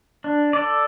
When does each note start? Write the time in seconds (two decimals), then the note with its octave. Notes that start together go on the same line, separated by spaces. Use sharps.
0.24 D4
0.53 A4 D5